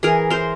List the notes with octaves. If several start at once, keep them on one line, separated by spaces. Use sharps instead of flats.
E3 G#4 A#4
A#4 C5